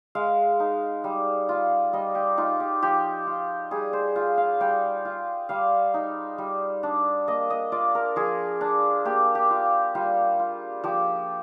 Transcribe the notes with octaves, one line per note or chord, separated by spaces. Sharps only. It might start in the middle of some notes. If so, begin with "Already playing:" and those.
G#3 F5
D#4
G3
F4
G3 D#5
G4
D#4 F4
G4
F3 G4
F4
G3 G#4
C5
F4
F5
G3 G5
F4
G3 F5
D#4
G3
D4
A#3 D#5
D#5
F4 D5
A#4
F3 G#4
D4
A#3 G4
G4
F4
G3 F4
F4
F3 G4